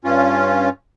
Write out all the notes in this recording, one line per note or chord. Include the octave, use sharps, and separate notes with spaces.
G2 C#4 F4